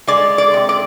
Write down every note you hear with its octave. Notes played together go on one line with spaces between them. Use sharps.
G#3 D5
D5
C3
D5